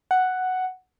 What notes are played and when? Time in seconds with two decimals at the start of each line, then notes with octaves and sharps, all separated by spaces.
0.11 F#5